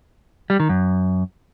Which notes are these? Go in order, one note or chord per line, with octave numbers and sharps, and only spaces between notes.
G3
D#3
F#2